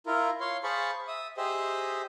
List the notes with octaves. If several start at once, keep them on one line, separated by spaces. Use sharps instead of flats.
E4 F4 A#4
C#5 F5 C6
G#4 C5 F5 A5 B5 C#6
E5 D#6
G4 G#4 C5 D#5 E5